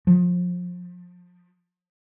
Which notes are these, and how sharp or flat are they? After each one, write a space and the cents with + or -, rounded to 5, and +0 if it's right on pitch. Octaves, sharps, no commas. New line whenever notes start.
F3 +30